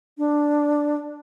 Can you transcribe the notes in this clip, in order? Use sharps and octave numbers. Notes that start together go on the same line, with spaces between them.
D4